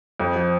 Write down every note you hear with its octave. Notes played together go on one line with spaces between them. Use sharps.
F2 F3
F3